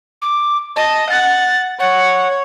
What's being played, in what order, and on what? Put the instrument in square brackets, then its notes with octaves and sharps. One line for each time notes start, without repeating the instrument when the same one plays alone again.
[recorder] D6
[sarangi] D#5 [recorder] A5
[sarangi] F#5 [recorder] A6
[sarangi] C#5 [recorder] F#5